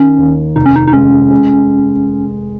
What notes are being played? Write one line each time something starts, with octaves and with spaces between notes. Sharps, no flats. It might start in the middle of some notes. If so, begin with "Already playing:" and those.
Already playing: D#3 C#4
D#2
F1 D#4
C#4
D#4
D#4
G#3 C#4
G#3